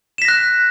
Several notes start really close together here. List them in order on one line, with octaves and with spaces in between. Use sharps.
E7 B6 A#6 F#6